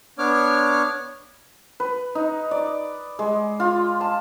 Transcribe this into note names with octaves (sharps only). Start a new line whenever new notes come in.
B3 D4 C#5 D6 F6
B4
D#4
D5
G#3
F4
A5